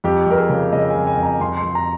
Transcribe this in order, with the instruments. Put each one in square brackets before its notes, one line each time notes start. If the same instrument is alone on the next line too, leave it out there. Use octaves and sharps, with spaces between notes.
[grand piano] F2 G4
F2 A#4
G#4
C#3
C#3 D#5
G#5
F2
G#5
F2
A#5
F2 C6
C6
F2
A#5